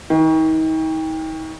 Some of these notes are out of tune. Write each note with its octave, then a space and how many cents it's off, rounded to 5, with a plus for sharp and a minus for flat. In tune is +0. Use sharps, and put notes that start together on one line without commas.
D#3 +35